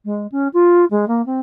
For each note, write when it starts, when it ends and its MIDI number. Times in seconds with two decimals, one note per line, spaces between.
0.05 0.27 56
0.31 0.48 61
0.53 0.85 65
0.90 1.07 56
1.08 1.24 58
1.26 1.40 60